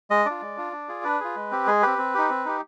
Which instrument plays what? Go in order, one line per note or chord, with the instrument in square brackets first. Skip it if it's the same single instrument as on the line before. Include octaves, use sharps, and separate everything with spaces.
[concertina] G#3 D#5
D4 F4 D5
G#3
D4 F4
D4
F4 G#4
D4 B4
F4 G#4
G#3
C4 G4
G#3 G#4
C4 G4 B4
C4
D#4 G4
C4
D#4 G4